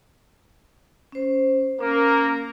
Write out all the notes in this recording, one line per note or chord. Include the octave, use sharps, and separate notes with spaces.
C#4 C5
A#3 C#4 A#4